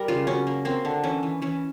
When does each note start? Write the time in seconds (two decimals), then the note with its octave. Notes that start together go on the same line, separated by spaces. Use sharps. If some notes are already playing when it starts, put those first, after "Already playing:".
Already playing: G3 A#4
0.08 C#3 F4
0.27 F#3 C#4
0.47 A#3
0.65 A#3 C4
0.85 D3
1.03 E3 C#4
1.23 E3
1.42 E3 C#4